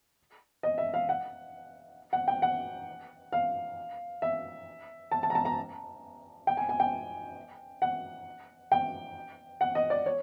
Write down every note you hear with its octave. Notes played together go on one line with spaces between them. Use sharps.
D#5
E5
F5
F#5
F#5
G5
F#5
F5
E5
A5
A5
A#5
A5
A#5
G5
G#5
G#5
G5
F#5
G5
F#5
D#5
D5
C#5